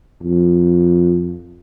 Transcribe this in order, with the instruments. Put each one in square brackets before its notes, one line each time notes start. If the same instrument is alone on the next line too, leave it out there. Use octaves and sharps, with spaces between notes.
[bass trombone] F2